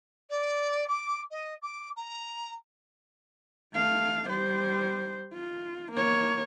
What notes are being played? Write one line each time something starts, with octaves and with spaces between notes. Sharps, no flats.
D5
D6
D#5
D6
A#5
A3 F5
G3 C5
F4
A#3 C#5